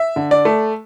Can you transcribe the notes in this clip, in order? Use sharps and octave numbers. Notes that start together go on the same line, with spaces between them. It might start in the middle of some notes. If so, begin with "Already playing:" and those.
Already playing: E5
D3
D5
A3